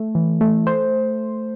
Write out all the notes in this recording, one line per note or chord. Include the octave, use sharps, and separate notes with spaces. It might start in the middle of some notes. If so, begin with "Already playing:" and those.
Already playing: A3
E3
A3
C5